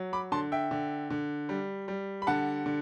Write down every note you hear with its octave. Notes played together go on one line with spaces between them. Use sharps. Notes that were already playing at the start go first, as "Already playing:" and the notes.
Already playing: F#3
B5 D6
D3 A5 C6
E5 G5
D3
D3
G3
G3
B5
D3 F#5 A5
D3